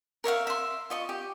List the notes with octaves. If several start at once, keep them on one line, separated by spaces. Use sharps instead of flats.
A#4 C#5 E5 F5
E5 C6
F4 D#5 C#6
G4